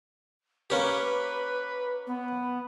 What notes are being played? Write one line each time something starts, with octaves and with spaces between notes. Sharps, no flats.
A#3 C#4 G4 B4
B3